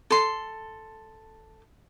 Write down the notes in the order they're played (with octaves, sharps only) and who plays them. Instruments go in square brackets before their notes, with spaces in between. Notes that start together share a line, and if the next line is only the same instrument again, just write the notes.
[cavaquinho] A4 C6